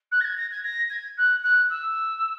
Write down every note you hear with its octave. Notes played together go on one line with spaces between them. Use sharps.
F#6
A#6
G#6
A#6
G#6
A#6
G#6
F#6
F#6
E6